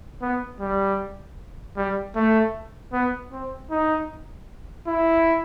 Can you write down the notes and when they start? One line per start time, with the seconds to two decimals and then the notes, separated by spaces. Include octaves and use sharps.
0.22 B3
0.60 G3
1.77 G3
2.15 A3
2.93 B3
3.32 C4
3.71 D#4
4.87 E4